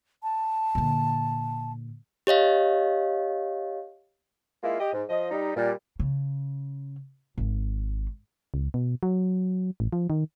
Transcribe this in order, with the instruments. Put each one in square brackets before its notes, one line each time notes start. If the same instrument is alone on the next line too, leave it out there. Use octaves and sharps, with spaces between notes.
[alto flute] A5
[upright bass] A#2 D3
[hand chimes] G4 C#5 D#5 F5
[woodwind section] G#3 A#3 E4 F4
G4 D#5
G#2
F3 D#5
G3 D#4
A#2 G3
[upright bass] C#3
G#1
[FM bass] C#2
B2
F#3
A1
F3
D#3